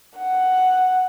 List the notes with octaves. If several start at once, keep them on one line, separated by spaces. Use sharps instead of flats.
F#5